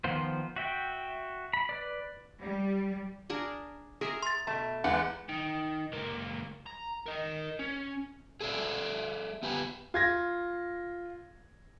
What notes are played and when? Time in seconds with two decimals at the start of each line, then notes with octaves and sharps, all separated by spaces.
0.04 D#3 F3 B3 F4 C5
0.56 F#4 E5 G5
1.53 B5
1.69 B4 D5
2.40 G3
3.30 D4 G#4 A#4
4.01 G#4 A#4 E5 A#5
4.23 C6 A6
4.47 B2 A3 A5
4.84 E2 G#3 F#5
5.29 D#3
5.92 C#2 A#3
6.66 A#5
7.06 A#4 D#5
7.59 C#4
8.41 G#4 A4 C#5 D5 E5
9.43 B3 G4 B4 G#5
9.94 F4 G#6 A#6